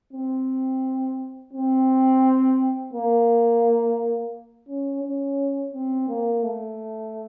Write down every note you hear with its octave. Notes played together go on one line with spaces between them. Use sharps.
C4
C4
A#3
C#4
C#4
C4
A#3
A3